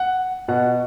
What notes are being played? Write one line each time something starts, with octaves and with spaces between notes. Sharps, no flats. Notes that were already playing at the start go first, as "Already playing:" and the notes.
Already playing: F#5
B2 F#5